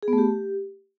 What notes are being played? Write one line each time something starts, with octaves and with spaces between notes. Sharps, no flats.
G#4
B3
A3
G4